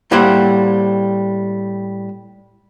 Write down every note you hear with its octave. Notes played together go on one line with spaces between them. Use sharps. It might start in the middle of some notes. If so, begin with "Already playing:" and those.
A2 G3 A#3 E4 C5 F#5